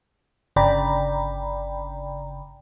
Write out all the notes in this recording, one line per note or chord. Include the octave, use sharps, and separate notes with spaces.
G1 C#3 D5 G5 A#5 B5